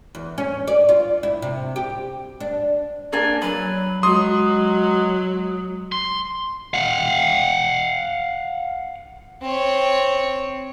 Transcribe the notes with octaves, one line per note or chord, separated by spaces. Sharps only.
E2
C#4
D5
F4
E4
C3
G4
D4
A#3 D4 G#5
F#3 B4
F#3 G#3 C6 D#6
C6
F5 F#5
C4 C#5